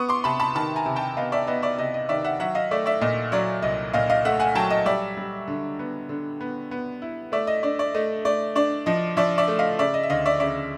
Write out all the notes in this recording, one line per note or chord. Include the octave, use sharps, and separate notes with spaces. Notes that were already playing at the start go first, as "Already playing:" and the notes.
Already playing: B3 C#6 D#6
C6 D6
C3 A5 B5
A5 B5
D#3 A5 B5
G#5 A#5
C3
G5 A5
B3 D#5 F5
D5 E5
B3 D#5
D5 E5
C3 D#5
D#5
D#3 D5 E5
E5 F#5
F#3 E5 F#5
D#5 F5
A3 D5 E5
D5 E5
A#2 D#5
F#3 D5
C2 D#5
A#2 D#5 F5
D#5 F5
A3 E5 F#5
F#5 G#5
F#3 G5 A5
D#5
G3 D5 E5
G3
D3
B3
D3
B3
B3
E4
A3 D5 E5
D#5
D4 D5
D5
A3 D#5
A3 D5
D4 D5
F3 D#5
F3 D5 E5
D5 E5
A3
D#5 F5
C#3 D5 E5
D#5
E5
D2 D#5 F5
D5 E5
C#3 D5 E5